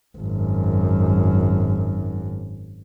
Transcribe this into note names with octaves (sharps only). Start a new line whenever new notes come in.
G#1 F#2